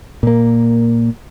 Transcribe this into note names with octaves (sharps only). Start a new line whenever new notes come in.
A#2 A#3